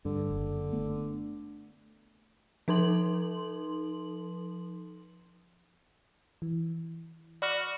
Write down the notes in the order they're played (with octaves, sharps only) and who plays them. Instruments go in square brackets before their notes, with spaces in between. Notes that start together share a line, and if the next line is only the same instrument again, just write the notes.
[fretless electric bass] G2 [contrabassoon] D3
[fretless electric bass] F#1
A3 B3
[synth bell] F3 D#4 A4 C6 F#7
[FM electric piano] E3
[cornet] F#4 [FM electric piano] D5 B5 F6